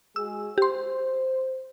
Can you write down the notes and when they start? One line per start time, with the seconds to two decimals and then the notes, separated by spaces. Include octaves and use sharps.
0.16 G#3 F#4 G#4 E6
0.58 G4 C5 C6